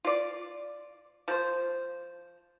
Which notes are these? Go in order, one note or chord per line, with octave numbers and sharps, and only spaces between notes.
F4 D5
F3 C5